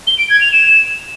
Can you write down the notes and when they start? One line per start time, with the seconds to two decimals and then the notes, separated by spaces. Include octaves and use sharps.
0.07 G7
0.18 D7
0.30 G#6
0.41 F7
0.52 E7